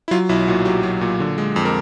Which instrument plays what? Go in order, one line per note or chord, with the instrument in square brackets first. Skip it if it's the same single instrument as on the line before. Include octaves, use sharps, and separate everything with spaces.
[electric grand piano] E4
F#3 F4
B1 E4
A#2 F#4
F#3 G4
F#3
A#2
D3
G#3
F2
A#4